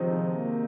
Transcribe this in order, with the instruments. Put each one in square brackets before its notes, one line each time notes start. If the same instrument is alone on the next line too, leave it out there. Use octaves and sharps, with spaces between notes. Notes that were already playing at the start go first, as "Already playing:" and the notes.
Already playing: [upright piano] C3 D#3 G#3 D#4 [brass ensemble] F3
[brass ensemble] A#3